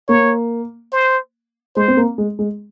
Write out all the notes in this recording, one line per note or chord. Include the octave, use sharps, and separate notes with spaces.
A#3 C#5
C5
G#3 C5
C4
A#3
G#3
G#3